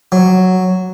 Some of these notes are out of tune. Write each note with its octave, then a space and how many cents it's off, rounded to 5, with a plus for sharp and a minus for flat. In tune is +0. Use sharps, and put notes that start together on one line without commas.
F#3 +0